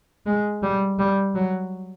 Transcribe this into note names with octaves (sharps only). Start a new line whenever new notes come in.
G#3
G3
G3
F#3